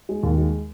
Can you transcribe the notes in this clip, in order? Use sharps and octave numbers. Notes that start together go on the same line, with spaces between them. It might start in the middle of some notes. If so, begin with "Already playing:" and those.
G#3
D#2
G#3